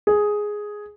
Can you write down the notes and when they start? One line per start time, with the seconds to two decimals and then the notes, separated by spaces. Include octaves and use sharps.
0.07 G#4